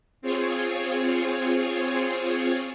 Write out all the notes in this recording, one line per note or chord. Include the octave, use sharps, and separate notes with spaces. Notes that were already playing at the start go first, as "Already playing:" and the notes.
C4 F4 G#4 C#5